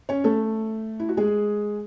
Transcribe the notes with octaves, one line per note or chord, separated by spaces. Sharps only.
C#4 C#5
A3 A4
E4
F#4
G#3 G#4